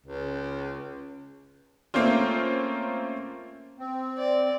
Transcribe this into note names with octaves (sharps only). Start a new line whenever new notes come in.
C#2
A3 A#3 C4 C#4 F4
C4
D5